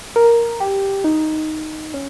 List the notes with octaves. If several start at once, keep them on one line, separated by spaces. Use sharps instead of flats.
A#4
G4
D#4
C#4